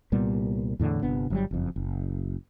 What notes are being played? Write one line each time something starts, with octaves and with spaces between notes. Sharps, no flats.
C2 A#2 G3 B3
E2 A2 D3
G1 C3 B3 D4
G1 F#3 G3
F#1 F2
F#1